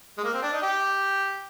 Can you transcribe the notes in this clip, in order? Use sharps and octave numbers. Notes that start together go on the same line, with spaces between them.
G#3
A#3
C4
D4
D#4
G4